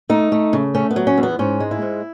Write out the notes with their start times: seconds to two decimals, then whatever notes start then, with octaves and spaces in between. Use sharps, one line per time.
0.09 A3 D#4
0.32 A3
0.53 C#3
0.75 A3 C#4
0.91 B3
0.96 F#3
1.07 C#4
1.18 E2
1.23 B3
1.39 G#2 C#4
1.60 G#3
1.71 E4
1.82 G#2